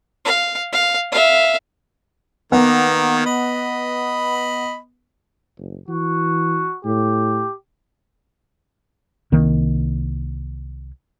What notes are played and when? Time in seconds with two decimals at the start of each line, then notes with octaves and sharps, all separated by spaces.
0.25 F5
0.73 F5
1.12 E5 F5
2.52 D#3 A#3 B3
3.26 D#5 B5
5.58 F#1
5.88 E3 F#4
6.85 A2 G4
9.32 C2 D#3 A#3